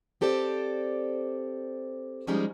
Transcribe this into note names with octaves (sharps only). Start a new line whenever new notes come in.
C4 G4 A4 C5 D5
F3 G3 G#3 C#4 D#4